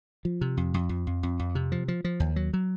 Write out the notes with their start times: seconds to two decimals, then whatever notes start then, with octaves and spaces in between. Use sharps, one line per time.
0.25 F3
0.41 C3
0.57 F2
0.74 F2
0.89 F2
1.07 F2
1.23 F2
1.39 F2
1.55 C3
1.72 F3
1.88 F3
2.04 F3
2.20 D#2
2.36 F#3
2.53 F#3